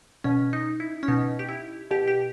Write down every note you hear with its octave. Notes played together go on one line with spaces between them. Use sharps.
B2 C#4
D#4
E4
C#4
B2 D#4
G4
E4
B2 G4
G4